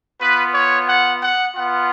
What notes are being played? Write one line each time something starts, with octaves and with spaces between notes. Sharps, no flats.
B3 F4 B4
C#5
F#5
F#5
B3 F4 F#5